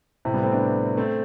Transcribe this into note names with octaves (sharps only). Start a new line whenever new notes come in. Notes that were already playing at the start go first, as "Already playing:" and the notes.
A2 C3
G3 B3
A3 C4
B3 D4
A3 C4